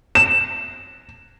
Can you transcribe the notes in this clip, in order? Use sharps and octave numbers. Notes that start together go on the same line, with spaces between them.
E7